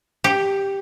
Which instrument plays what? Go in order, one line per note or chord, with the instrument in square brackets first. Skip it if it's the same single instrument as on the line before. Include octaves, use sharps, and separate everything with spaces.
[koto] G4